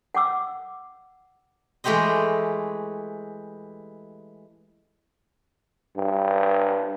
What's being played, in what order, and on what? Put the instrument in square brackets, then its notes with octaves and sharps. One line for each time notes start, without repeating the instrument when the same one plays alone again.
[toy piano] F#5 G5 D6 E6
[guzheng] E3 G#3 A3 G4 C5 D#5
[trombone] G2